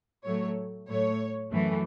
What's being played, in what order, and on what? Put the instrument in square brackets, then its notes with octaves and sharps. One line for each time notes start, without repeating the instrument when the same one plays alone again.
[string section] A2 F#3 A3 C#5
A2 F#3 A3 C#5
F#2 E3 A3